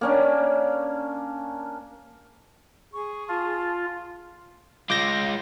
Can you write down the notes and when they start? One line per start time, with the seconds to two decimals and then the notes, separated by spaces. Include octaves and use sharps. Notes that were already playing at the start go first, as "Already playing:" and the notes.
0.01 A#3 C#4 D4
2.93 G#4 C#6
3.28 F4 A5
4.90 G#3 F4 D6 G6 A#6